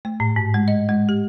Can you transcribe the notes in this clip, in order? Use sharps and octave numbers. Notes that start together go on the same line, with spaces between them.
A3
A2
G#2
G#3
D#5
G#3
G4